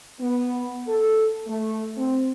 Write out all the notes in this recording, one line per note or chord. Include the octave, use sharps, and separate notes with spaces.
B3
A4
A3
C4